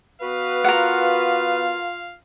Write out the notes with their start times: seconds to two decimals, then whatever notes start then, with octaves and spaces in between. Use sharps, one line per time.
0.21 B3 F#4 B4 F5
0.64 F4 A#4 F#5